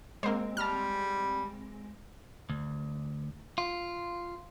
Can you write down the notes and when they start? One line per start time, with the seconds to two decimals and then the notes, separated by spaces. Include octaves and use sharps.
0.23 G#3 A#3 C4 C5
0.57 G3 A5 F6
2.50 D2
3.58 F4